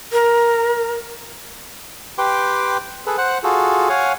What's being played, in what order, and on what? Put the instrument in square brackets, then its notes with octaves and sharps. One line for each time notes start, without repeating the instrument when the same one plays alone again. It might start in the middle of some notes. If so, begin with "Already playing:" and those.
[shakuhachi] A#4
[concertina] G4 B4 G5 C6 D6
G#4 A4 B4
C5 F#5 F#6
F4 F#4 G#4 A4
C#5 F5 F#5 G#5